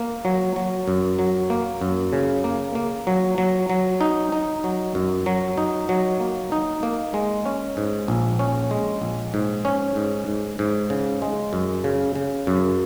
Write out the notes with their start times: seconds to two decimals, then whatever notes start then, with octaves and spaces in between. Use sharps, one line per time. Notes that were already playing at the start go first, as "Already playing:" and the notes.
Already playing: A#3
0.25 F#3
0.56 F#3
0.88 F#2
1.19 F#3
1.50 A#3
1.81 F#2
2.13 C#3
2.44 A#3
2.75 A#3
3.07 F#3
3.38 F#3
3.70 F#3
4.01 D#4
4.32 D#4
4.64 F#3
4.95 F#2
5.26 F#3
5.58 D#4
5.89 F#3
6.20 A#3
6.52 D#4
6.83 A#3
7.14 G#3
7.46 C#4
7.77 G#2
8.08 A#1
8.39 C#4
8.71 G#3
9.02 A#1
9.34 G#2
9.65 C#4
9.96 G#2
10.28 G#2
10.59 G#2
10.90 C#3
11.22 G#3
11.53 F#2
11.84 C#3
12.15 C#3
12.47 F#2